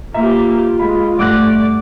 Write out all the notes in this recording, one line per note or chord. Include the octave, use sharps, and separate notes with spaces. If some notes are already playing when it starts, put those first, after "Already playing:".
A#3 F4 G4 E5 A#5
G#3 B5
G2 A3 D5 F#5 D6 F#6 A#6